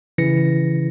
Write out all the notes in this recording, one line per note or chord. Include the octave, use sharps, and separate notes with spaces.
C#3 E3 A#6 C#7